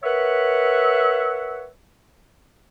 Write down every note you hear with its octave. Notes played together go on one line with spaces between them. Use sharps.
A#4 B4 C#5 E5 F#5